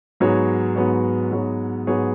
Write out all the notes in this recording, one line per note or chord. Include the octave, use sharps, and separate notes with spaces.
G#2 F#3 B3 G#4 C#5
G#2 F#3 B3 G#4 C#5
G#2 F#3 B3 G#4 C#5
G#2 F#3 B3 G#4 C#5